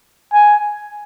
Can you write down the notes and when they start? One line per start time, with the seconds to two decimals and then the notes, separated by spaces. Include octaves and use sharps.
0.33 G#5